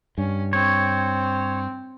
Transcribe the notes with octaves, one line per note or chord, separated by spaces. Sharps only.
G2 C#4
C4 C#5